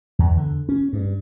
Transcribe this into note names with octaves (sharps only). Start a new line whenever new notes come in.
E2
D3
C#4
G2